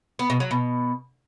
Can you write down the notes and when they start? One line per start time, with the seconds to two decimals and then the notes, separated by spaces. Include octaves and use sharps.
0.19 B3
0.30 B2
0.40 F#3
0.51 B2